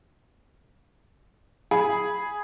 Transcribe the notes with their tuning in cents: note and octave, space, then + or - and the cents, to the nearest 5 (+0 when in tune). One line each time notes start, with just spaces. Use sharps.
G#4 +0 B5 +0